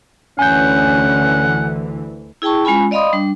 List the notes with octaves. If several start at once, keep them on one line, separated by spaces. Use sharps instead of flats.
D2 D3 E3 C#4 F#5 G#5 G6
E4 G#4 G5 A5 C#6
G#3 C#4 F4 G#5 B5
D5 D#5 F5 B5 C6 D#6
G3 D4